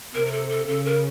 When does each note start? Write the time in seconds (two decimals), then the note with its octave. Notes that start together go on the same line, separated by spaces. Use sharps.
0.14 C3 A#4
0.27 A#4
0.32 A4
0.50 A4
0.68 C#3 A4
0.85 A#4